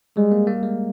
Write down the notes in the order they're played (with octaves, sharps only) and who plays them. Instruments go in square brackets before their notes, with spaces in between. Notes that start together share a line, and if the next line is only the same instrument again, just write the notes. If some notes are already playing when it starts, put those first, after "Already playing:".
[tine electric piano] G3 [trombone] G#3
[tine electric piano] A#3
A#3
G#3